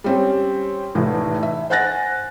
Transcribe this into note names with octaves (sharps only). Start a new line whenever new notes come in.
G3 C4 C#4
F1 A2 E3
E5
C5 F#5 G#5 F#6 A6 A#6